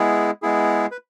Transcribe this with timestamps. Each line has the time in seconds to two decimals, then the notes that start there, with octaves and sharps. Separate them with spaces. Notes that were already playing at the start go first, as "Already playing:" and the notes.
Already playing: G#3 B3 E4 G#4
0.42 G#3 B3 E4 G#4
0.91 B4